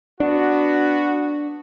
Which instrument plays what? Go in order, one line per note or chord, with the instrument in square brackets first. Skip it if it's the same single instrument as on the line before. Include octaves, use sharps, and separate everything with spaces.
[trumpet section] B3 F#4 [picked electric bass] D4